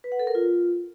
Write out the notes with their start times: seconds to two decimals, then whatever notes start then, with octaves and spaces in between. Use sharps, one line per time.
0.04 B4
0.12 F#5
0.19 A4
0.27 A#4
0.35 F4